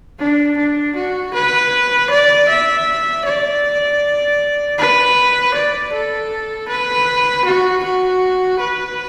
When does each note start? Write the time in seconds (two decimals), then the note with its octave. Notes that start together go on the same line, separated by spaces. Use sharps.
0.19 D4
0.58 D4
0.96 F#4
1.34 B4
2.11 D5
2.49 E5
3.25 D5
4.78 B4
5.54 D5
5.93 A4
6.68 B4
7.45 F#4
7.83 F#4
8.60 B4